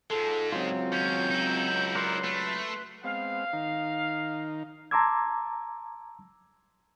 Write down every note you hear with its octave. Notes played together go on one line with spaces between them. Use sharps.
G#2 G#3 F4 A4
C#2 F#3 C4 F4
D#2 C#4 G6
D#4 E4
A#4 D5 F#5 C6
A3 B4
G#3 B3 C4 F5
D#3 D#4
A5 A#5 C6 D6 E6 G#6